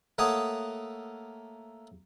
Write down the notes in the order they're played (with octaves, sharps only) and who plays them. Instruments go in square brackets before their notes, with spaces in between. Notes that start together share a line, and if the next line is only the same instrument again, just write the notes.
[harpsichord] A3 A#3 C#5 F#5 D#6